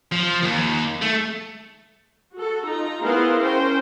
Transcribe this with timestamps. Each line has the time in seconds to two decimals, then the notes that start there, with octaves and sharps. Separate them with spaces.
0.12 F3
0.43 D#2
1.02 A3
2.34 F#4 A4
2.66 D#4 F4 A#5
3.04 B3 E4 G#4 A#4 C5 F5
3.42 C#4 A#4 C5 G5